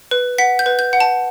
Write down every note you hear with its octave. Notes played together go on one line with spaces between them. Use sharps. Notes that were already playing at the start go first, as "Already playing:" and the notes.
B4
F#5 B6
G6
B4
G6
F#5
A5